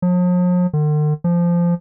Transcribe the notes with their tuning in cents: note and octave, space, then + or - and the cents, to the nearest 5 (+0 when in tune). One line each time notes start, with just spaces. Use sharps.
F3 +45
D3 +45
F3 -15